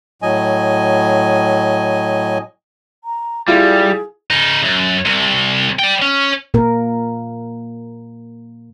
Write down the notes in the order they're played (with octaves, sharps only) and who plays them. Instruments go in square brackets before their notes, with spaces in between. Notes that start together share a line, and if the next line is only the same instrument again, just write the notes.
[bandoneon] A2 F#3 D#5 G#5
[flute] A#5
[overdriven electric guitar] G3 [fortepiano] E4 F4 [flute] G#4
[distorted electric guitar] C#3 D#4
F#2
C2 C3
D5 G5
C#4
[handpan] A#2 A#3 A#4